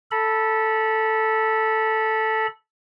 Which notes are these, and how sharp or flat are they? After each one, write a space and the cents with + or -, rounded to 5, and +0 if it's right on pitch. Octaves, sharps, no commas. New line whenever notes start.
A4 +0 B5 -25